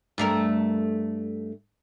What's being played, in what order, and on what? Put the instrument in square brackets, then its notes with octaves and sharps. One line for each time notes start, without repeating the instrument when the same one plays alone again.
[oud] G2 A3 A#4